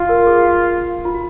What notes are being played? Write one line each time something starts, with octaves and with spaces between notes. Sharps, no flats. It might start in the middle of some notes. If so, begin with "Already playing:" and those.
Already playing: F4
A#4
G#4
F#4
F4
F#4